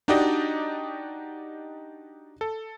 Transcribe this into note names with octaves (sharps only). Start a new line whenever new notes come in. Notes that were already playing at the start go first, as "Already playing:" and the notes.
D4 D#4 F#4 G4 D5 D#5
A4